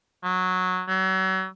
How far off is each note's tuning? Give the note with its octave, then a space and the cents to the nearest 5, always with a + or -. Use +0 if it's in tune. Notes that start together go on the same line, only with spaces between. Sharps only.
F#3 -10
F#3 +35